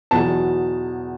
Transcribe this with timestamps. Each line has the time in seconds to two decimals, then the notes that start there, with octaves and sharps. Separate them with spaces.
0.11 E2 B2 F#3 B3 A5